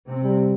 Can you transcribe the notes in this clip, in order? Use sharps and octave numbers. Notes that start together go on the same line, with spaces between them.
C3 C4
G3